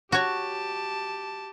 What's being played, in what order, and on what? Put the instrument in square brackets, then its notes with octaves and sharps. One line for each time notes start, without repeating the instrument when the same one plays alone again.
[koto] F#4 C#5 [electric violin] G4 A5